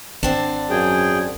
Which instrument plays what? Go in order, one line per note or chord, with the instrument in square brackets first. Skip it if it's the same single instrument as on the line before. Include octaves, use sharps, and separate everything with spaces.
[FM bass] G#1 [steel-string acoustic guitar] D3 C4 D4
[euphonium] F#2 [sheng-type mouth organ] G#4 G5